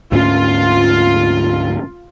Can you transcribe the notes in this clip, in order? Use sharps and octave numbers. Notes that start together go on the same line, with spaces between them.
D2 G#2 C#4 F4